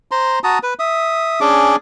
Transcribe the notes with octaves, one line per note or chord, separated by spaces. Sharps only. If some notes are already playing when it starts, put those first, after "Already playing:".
C5 A#5 C6
F#4 A5 A#5 D#6
B4
E5 D#6
C#4 D4 G#4 D6